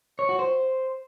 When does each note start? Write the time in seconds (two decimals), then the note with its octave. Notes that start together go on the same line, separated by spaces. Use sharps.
0.19 C#5
0.29 F#4
0.39 C5